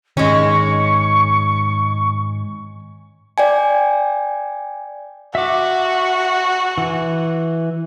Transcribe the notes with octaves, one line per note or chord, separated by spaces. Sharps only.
G#2 D#3 G#3 C#4 C#6
D5 G5 G#5
F#4 E5 D6
E3